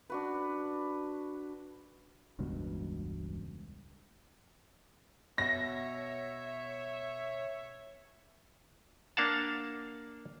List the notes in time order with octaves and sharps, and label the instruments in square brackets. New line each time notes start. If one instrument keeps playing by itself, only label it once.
[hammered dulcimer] D4 F#4 B4
[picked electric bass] E1 C#2 G2 B2
[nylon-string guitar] B2 [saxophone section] C#5 E5 [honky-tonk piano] A#6
[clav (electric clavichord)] A#3 D4 F5 F#5 A5